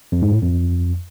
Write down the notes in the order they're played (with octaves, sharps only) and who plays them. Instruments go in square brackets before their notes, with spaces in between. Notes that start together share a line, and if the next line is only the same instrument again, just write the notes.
[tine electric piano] F2
G#2
A2
F2